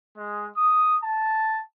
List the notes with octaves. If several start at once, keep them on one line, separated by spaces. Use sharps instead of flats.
G#3
D#6
A5